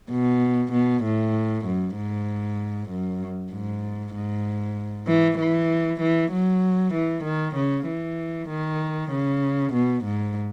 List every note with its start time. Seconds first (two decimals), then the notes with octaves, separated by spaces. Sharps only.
0.10 B2
0.72 B2
1.04 A2
1.65 F#2
1.96 G#2
2.90 F#2
3.52 G#2
4.14 G#2
5.07 E3
5.38 E3
6.01 E3
6.32 F#3
6.94 E3
7.24 D#3
7.56 C#3
7.87 E3
8.49 D#3
9.11 C#3
9.73 B2
10.04 G#2